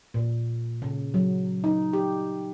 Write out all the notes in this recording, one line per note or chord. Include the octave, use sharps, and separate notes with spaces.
A#2
C#3
F#3
D#4
G4